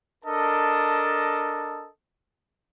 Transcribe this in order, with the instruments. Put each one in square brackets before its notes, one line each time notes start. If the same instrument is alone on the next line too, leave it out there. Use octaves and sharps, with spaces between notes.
[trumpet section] D4 A4 A#4 D#5 A5